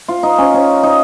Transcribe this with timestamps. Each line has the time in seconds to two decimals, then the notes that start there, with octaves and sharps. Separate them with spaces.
0.08 F4
0.23 D#4
0.38 C#4
0.54 C#4
0.83 D#4